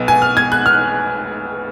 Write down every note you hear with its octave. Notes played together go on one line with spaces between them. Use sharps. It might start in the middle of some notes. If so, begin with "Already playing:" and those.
Already playing: B1 B2
G#5
F6
G#6
F#6
F6